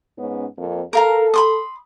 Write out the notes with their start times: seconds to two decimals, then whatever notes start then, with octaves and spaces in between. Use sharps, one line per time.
0.17 G#2 B3 C#4
0.57 F2 A#3 C4
0.93 A4 A#4 F5 A#5
1.34 B5 C6 D#6